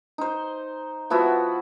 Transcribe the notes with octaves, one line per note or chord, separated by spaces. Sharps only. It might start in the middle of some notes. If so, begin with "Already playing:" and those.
D#4 C5
F3 B3 E4 F#4